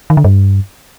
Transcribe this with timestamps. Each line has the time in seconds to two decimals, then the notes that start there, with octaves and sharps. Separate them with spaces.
0.10 D#3
0.17 D3
0.24 G2